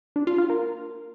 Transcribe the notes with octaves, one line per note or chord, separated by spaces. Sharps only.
D4
F4
F4
A#3